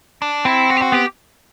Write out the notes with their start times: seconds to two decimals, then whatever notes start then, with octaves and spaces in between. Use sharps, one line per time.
0.22 D4
0.45 C4 E4
0.70 F#4
0.77 G4
0.82 F#4
0.92 B3 G4